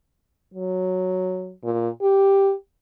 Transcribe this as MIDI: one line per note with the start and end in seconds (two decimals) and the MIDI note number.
0.54 1.53 54
1.64 1.89 46
2.01 2.53 67